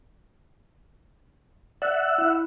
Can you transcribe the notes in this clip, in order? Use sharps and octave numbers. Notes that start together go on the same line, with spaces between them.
D5 E5 F#5
E4